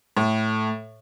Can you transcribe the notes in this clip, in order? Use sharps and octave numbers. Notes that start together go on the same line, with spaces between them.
A2